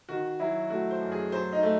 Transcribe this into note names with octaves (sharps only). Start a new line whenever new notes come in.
D#3 F#4
F#3 E4
A3 F#4
C5
F#2
G#4
F#3 C5
D#4
A3